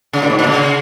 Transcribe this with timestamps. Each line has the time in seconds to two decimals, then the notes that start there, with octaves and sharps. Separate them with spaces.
0.13 C#3
0.22 A#2
0.30 G#2
0.39 A#2
0.47 C#3